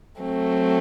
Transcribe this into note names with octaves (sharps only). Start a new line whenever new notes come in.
F#3 A3 C4